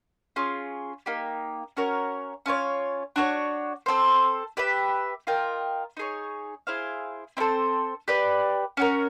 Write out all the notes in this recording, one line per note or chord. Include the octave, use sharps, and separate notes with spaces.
C#4 F4 G#4
A#3 D#4 G4
C#4 F#4 A#4 C#5
C#4 F4 A4 C#5
D4 F#4 A4 C#5
C4 E4 A4 C5
G4 B4 E5
F4 A#4 D#5 G5
D#4 G#4 C#5
E4 G#4 C5 F5
C4 E4 A4 C5
G4 B4 D5
C#4 F#4 A#4